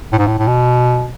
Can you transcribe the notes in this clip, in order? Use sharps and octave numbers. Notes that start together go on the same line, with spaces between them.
A2
G#2
A2
A2
B2